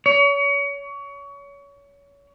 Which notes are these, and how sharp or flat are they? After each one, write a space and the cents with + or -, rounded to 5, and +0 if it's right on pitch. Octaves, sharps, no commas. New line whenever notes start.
C#5 +30